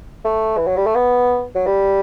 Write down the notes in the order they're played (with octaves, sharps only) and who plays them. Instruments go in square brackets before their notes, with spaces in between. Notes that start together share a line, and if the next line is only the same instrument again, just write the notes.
[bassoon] A3
E3
F#3
G3
A3
B3
F#3
G3